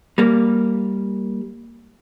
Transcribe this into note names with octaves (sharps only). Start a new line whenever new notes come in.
G3 A#3